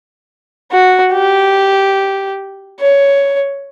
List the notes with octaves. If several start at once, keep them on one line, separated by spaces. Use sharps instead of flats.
F#4
G4
C#5